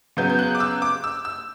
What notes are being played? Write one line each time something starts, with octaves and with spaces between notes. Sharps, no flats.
C#3 F#3 B3 G6
G6
F#6
D6
E6
D6
E6
E6